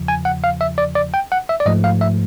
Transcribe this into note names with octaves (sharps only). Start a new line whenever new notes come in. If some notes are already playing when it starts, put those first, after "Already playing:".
Already playing: E2 C#3 F3
G#5
F#5
F5
E5
D5
D5
G5
F#5
E5
D5
G#2 F3 A3 D#5
F5
E5